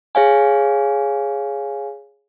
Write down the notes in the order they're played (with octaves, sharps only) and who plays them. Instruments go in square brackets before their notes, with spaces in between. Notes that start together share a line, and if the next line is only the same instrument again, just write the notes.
[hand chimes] G#4 C#5 F5 G#5